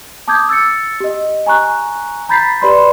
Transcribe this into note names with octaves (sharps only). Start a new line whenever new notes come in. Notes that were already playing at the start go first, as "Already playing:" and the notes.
A5 D6 D#6 G6 G#6
E6 A6 C#7
G4 D#5
G#5 A#5 C#6 F#6
A#5 B5 G6 A6 B6 C7
G4 B4 D5 B5 C6